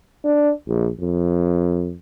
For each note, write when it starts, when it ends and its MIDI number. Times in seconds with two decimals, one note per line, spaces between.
0.25 0.51 62
0.68 0.89 34
1.00 1.95 41